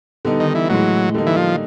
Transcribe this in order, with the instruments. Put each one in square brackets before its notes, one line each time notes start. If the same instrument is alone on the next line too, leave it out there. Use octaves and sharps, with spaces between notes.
[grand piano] D3 G3 B3 D#4
[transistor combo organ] D#3
E3
[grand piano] A2 E3 G#3 [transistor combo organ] F#3
[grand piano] D3 G3 A#3 D#4
[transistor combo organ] E3
F3